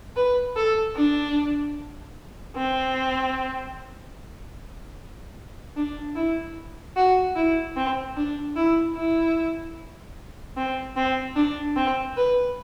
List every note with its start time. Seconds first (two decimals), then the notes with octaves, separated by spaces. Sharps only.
0.16 B4
0.57 A4
0.96 D4
2.56 C4
5.76 D4
6.16 E4
6.96 F#4
7.36 E4
7.76 C4
8.16 D4
8.56 E4
8.96 E4
10.57 C4
10.96 C4
11.36 D4
11.76 C4
12.17 B4